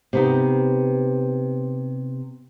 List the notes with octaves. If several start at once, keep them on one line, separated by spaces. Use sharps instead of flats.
C3 B3 D#4